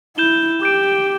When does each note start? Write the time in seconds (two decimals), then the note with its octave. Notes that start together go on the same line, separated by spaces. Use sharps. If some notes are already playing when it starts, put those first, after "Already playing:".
0.17 E4 G6 E7 G7
0.62 G4 D6 G6 D7